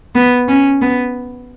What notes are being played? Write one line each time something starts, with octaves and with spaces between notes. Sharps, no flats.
B3
C#4
B3